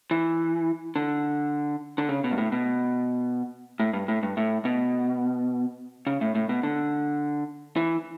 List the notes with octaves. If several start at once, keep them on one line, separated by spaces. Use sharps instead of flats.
E3
D3
D3
C#3
B2
G2
A2
B2
A2
G2
A2
G2
A2
B2
C#3
A2
A2
B2
D3
E3